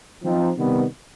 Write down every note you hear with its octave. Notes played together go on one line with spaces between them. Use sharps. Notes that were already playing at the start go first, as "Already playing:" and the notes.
F3 C4 D#4
C3 D#3 G3 B3